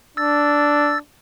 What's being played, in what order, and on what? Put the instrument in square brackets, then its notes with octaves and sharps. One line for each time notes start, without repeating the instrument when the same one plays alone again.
[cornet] D4 [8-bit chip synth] E6 A6